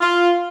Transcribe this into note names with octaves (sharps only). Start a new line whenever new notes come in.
F4